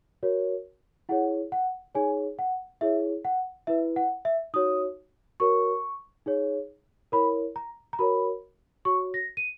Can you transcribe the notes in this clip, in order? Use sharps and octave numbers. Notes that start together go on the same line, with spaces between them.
F#4 A#4 C#5
E4 G#4 C#5 F#5
F#5
D#4 G#4 C#5 G#5
F#5
E4 G#4 C#5 E5
F#5
E4 B4 E5
F#5
E5
D#4 F#4 C#5 D#6
F#4 A#4 C#5 C#6
D#4 G#4 C#5
E4 A#4 C#5 B5
A#5
A#5
F#4 A#4 C#5 B5
F#4 C#5 C#6
A#6
D#7